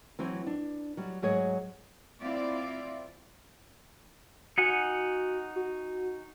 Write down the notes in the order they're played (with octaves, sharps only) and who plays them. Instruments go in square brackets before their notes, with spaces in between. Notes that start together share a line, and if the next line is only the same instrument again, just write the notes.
[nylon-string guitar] E3 F#3 C4
D4
F#3 G3
G#2 F#3 G#4 C#5
[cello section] C4 E4 F4 D5
[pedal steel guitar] D#4 F#5 G#5 [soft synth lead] F#4
[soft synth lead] F#4